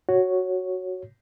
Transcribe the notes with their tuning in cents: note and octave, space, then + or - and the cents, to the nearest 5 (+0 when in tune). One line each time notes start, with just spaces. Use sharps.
F#4 +0 C#5 +0